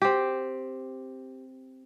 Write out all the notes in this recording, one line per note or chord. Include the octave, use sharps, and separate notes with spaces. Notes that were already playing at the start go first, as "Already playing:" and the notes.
C4 G4